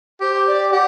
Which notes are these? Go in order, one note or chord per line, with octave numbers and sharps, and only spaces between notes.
G4 C5
D5
G4 F#5